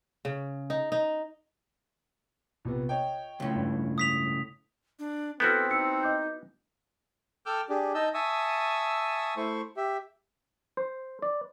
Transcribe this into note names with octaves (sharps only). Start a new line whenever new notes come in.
C#3
D#4
D#4
A#1 C3 B3
C#5 D#5 G5
C#2 A2
G2
D#6 B6 F7
D4
B3 C4 E4 F#4 A4 F6 G6
D#4 E6 C#7
D#5 D6 G6
A4 G5 D6 E6 F6 G6
D4 G4 G#4
D#4 D#5 A5 E6 G6
E5 G#5 A5 C#6 D#6 E6
A3 E4 C5 C#6
G4 E5
C5
D5